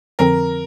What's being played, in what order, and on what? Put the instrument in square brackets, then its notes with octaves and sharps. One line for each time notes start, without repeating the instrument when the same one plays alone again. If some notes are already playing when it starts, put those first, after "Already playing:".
[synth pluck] F2 D3 F3 C4 [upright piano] A#4